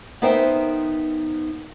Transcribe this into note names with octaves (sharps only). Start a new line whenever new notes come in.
B3 D#4 A#4 C5 E5 G5